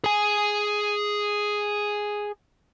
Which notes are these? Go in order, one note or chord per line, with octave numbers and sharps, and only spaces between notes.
G#4 G#5